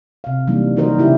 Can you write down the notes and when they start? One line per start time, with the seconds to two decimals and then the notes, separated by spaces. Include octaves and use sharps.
0.24 C3 F5
0.47 E3 F#3 G3 A#3 D4 D#4
0.76 D#3 D#4 F#4 A#4 C5 D#5
0.99 C#3 E4 G4